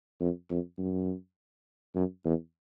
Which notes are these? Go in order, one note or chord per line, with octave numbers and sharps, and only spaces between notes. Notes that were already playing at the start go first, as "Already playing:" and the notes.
F2
F2
F#2
F#2
E2